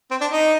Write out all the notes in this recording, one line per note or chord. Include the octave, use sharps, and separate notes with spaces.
C4
D4
D#4